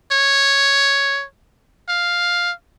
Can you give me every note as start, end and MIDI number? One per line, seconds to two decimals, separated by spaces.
0.12 1.24 73
1.89 2.52 77